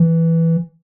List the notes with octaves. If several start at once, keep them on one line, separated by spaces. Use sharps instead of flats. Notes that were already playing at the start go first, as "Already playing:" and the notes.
Already playing: E3